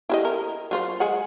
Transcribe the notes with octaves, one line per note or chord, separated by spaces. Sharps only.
E4 G4 D#5
A#4
F#3 F4 C5
G#3 G#4 F#5